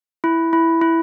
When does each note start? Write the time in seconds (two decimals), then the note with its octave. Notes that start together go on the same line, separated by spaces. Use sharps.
0.24 E4
0.53 E4
0.81 E4